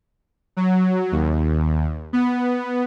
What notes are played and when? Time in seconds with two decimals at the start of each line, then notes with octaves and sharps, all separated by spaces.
0.57 F#3
1.12 D#2
2.13 B3